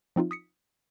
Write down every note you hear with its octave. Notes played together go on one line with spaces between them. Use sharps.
F3 C4 D#4 F4
D#6 B6 C#7